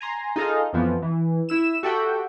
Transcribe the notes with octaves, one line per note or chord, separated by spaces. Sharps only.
G#5 A#5 C6
D#4 F4 G#4 A4 D#5 F5
F2 E3 F3 B3
E3
E4 E6 E7
F#4 G4 A4 E5 F#5 G5